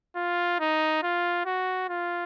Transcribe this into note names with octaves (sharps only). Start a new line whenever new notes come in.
F4
D#4
F4
F#4
F4